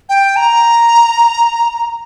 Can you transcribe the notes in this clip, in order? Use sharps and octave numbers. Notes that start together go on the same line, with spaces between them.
G5
A#5